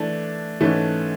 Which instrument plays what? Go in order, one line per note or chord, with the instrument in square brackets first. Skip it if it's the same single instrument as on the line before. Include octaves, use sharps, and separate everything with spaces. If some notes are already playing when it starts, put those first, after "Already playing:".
Already playing: [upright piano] E3 A3 D4
G#2 E3 A3 C#4